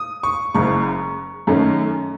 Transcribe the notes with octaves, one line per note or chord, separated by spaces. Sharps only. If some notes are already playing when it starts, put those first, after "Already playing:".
Already playing: D#6
C#6
F#1 F#2 C#3 C#6
F#2 D#3 A3 C#4